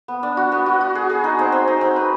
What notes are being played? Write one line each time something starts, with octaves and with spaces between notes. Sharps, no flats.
B3
D4
F#4
B3
F#4
F#4
G#4
G#4
D#4
C4
C4
D#4
C4
B4